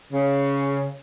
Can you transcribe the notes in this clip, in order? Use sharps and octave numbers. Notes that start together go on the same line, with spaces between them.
C#3